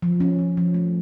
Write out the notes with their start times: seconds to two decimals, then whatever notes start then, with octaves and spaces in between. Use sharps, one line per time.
0.02 F3
0.20 C#4
0.39 F3
0.57 F3
0.74 A3